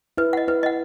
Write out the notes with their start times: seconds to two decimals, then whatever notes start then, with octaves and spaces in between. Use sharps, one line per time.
0.17 E4 B4
0.33 D#5 F#5
0.48 E4 B4
0.63 D#5 F#5